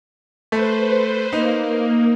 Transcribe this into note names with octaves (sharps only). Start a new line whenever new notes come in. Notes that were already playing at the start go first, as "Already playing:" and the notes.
A3 B4 C5
A#3 D#4